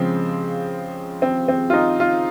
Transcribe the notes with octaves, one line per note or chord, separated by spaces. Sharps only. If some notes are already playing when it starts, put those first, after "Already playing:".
Already playing: C#3 F3 G#3 C4
C4
C4
F4
D#4
F4